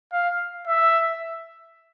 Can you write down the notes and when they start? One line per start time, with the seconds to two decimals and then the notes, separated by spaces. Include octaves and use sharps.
0.13 F5
0.67 E5